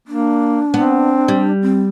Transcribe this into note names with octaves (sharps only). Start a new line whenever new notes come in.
A#3 D4
B3 C4
G3
C4